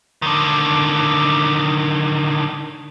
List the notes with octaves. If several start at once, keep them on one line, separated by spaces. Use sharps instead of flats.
D3 D#3